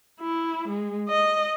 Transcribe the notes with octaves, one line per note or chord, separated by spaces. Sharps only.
E4
G#3
D#5